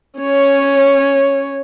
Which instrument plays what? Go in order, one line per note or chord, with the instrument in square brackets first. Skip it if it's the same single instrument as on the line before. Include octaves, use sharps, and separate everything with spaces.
[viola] C#4 C#5